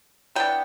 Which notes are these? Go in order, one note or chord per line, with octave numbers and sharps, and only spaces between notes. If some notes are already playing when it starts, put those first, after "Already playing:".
E3 B3 D4 G5